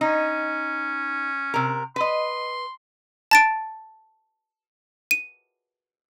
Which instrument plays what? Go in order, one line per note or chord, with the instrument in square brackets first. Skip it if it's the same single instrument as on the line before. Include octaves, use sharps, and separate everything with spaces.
[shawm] C#4 [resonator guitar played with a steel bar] D#4
[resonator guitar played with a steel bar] C3 A#4
[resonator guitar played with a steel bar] B4 D#5 [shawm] C6
[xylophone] A5 A6 D7
D#7